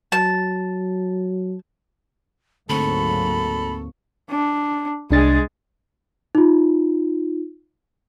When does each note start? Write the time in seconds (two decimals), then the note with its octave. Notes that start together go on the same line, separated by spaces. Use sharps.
0.12 F#3 A5
2.70 D2 G#2 F#3 A#3 C4 A4 B5 C#6
4.30 D4
5.11 C2 G#3 D4 G#4 A6
6.35 D#4 F4